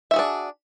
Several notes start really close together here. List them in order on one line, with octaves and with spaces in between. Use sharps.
E5 F#4 G#4 D4